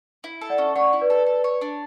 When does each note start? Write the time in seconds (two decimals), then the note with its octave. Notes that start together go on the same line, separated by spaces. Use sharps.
0.24 E4
0.41 A4
0.50 D5 F#5
0.58 C#4
0.76 C#5 D5 F#5
0.93 E4
1.01 B4 D5
1.10 A4
1.26 A4
1.44 C#5
1.61 D4